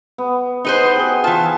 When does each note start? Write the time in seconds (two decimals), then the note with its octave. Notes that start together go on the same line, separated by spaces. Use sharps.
0.18 B3
0.65 B3 D#4 G#4 B4 C5
0.96 F#4 G#4 G5
1.24 E3 F4 A5